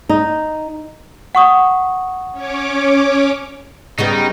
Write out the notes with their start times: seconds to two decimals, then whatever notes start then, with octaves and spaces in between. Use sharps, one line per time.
0.09 D#4
1.35 F#5 C#6 D#6
2.32 C#4 C#5 D6
3.98 C#3 G3 B3 D#4